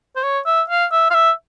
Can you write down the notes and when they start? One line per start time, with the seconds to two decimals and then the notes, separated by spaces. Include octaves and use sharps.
0.16 C5
0.23 C#5
0.46 E5
0.69 F5
0.92 E5
1.10 F5
1.15 E5